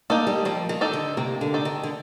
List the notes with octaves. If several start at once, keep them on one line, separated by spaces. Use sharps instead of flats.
A#3 D#4 A4 D5
G3
F3 A#3
D#3
D#4 A4 D5
D3
C3 A#3
D3
D#4 A4 D5
D#3
D3